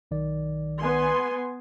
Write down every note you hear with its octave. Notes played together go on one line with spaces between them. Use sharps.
B1 D#3 D5
B3 G#5 C6